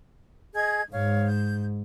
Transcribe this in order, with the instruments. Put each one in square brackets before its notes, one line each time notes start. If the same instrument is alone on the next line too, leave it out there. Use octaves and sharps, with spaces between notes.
[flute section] G#4 D#5 G#6
[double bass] G#2 [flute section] C#5 F5
[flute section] G6